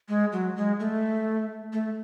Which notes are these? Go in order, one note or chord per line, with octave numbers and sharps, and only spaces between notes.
G#3
F#3
G#3
A3
A3